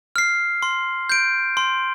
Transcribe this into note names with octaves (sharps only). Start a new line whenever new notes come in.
F6 C7
C6
G6 D7
C6